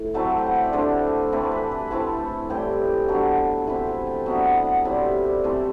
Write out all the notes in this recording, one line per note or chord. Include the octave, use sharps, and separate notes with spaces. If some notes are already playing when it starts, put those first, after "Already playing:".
Already playing: A2
F#3 A3 C4 E4 A5
G5
F#5
E5
D5
D3 A3 D4 C5
E3 A3 C4 B4
B4
B4
E3 A3 C4 E4 A5
A2 E3 G3 G5
D3 F#3 B3 A5
E3 A3 C4 E4 B4
A4
G5
F#3 B3 D4 E5
F#5
F#5
A2 G3 C4 E4 D5
E5
D5
C3 E3 A3 C5